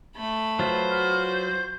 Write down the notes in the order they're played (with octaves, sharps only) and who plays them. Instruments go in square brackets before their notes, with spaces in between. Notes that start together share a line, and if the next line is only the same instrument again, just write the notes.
[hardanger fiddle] A3 B5
[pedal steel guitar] F#3 F4 B4 [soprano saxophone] C5
[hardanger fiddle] F#4 [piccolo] F6
[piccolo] G6